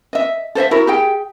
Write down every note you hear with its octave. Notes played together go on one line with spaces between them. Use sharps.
D#5 E5
A4 C5 D#5 E5
E4 F#4 A#4 B5
G4 G#4 G5